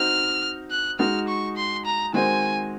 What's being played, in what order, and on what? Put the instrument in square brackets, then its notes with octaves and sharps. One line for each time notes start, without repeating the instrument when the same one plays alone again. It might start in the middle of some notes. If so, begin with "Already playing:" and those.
Already playing: [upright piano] C4 D#4 F#4 [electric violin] F6
[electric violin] F#6
[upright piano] G#3 D#4 F#4 [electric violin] F6
[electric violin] C#6
C6
A#5
[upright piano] D#3 G#3 C4 F#4 C5 [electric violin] G#5